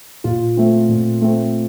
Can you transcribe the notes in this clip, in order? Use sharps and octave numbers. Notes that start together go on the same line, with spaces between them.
A#2 F4
A3 C4
A#2
A3 C4